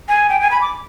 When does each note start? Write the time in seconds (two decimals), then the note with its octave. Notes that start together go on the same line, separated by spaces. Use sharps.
0.08 G#5
0.29 G5
0.41 G#5
0.51 B5
0.61 D6